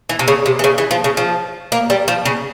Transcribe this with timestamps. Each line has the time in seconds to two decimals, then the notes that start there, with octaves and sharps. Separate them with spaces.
0.09 E3
0.19 C3
0.28 C#3
0.46 C3
0.59 E3
0.64 C#3
0.78 E3
0.91 F3
1.04 C#3
1.17 F3
1.72 A#3
1.90 G3
2.08 F3
2.25 C#3